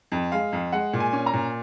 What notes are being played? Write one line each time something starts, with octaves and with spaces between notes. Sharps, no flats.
F2
G#3 F5
F2
G#3 F#5
A#2
G#5
C#4
A#5
A#2